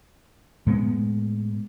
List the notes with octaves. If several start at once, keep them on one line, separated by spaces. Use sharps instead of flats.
A2 G#3 B3